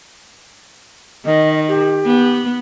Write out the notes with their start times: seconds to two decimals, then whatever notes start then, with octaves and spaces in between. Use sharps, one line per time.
1.26 D#3 D#5
1.68 G4
2.06 B3